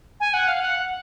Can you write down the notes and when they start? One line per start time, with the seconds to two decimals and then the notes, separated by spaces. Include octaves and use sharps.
0.20 G#5
0.33 F#5
0.48 F5
0.60 F#5